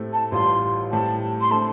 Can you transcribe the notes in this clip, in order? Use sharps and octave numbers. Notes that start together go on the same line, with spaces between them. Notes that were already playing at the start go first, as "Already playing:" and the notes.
Already playing: A2 A3 C4 G4
A5
A1 A2 G3 F4 C6
A2 G3 C4 G4 A5
C6
D3 A3 C4 A5